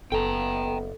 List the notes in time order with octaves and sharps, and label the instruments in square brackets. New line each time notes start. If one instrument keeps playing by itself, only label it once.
[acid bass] F#1 [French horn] B3 [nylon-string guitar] A4 [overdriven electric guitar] G5 A#5